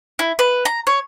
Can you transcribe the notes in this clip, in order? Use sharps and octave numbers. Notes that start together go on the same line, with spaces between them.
E4
B4
A#5
C#5